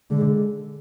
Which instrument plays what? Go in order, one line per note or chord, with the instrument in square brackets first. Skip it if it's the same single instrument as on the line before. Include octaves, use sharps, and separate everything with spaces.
[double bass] D3 [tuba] G#3